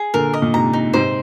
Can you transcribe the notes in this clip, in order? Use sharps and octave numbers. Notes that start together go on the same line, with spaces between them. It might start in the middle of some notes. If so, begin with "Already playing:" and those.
Already playing: G#4
A#2 D3 A#4
D#5
A#2
G#2 C3 A#5
D#4
G#2 C3 C5